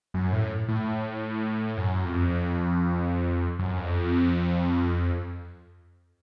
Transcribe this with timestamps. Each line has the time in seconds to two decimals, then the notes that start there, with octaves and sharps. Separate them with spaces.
0.14 F#2
0.32 A2
0.69 A2
1.78 F#2
2.05 F2
3.59 F#2
3.78 F2